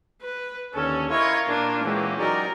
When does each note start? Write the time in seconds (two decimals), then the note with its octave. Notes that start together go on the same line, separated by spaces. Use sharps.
0.22 B4
0.74 D#2 D3 C#4 A4
1.10 E4 F4 A#4 C#5 D#5
1.48 A#2 A#3 D4
1.83 E3 G#3 C#4 F#4 G4
2.19 F#3 D#4 A#4 D5